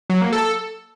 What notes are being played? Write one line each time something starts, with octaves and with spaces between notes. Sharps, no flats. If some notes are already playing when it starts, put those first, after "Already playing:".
F#3
A#3
A4